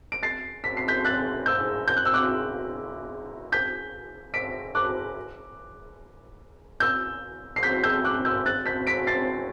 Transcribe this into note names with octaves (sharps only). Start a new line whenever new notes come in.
D7
A6 C7
B6
C7
G6 B6
F#6 A6
E6 G6
G6
F#6
E6
D6 F#6
G6 B6
B6 D7
D6 F#6
E6 G6
C7
G6 B6
E6 G6
D6 F#6
E6 G6
F#6 A6
G6 B6
B6 D7
A6 C7